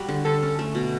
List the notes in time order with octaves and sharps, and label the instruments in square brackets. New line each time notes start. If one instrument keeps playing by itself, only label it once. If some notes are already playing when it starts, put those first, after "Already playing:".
Already playing: [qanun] G3 F#4
D3
[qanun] D3 [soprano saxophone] A4
[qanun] C#4
A3
B2